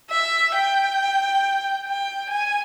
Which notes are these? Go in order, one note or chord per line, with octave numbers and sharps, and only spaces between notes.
E5
G5
G5
G#5